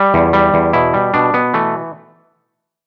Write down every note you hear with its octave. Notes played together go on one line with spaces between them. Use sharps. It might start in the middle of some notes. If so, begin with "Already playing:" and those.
Already playing: G3
E2
G3
E2
B2 E4
G3
B2 D4
B2 B3
E3 A3